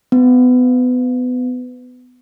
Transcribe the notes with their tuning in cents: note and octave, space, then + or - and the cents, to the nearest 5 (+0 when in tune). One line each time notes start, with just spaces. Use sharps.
B3 +25